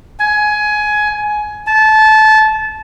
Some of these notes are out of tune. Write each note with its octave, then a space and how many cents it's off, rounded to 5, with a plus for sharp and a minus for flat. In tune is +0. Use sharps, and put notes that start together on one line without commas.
G#5 +20
A5 -20